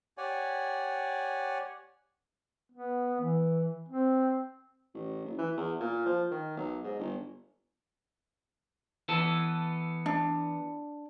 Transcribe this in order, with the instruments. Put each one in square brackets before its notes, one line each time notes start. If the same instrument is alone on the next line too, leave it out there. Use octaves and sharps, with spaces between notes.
[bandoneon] G4 C#5 D5 F#5 G#5
[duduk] B3
E3
C4
[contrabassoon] A1
F#1
E3
E2
A#2
F3
D#3
B1
G#2
G1
[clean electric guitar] E3 B3 A4
[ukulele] D4